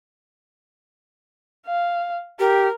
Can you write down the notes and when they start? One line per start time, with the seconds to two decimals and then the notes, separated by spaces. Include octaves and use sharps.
1.66 F5
2.39 G4 A#4